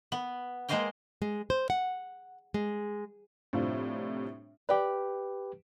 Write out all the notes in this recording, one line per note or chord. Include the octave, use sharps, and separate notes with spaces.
B3
G#3 A#3 C5 D#5 F5 G5
G#3
C5
F#5
G#3
A2 C3 F3 G3 D4 F4
G4 B4 D5 G5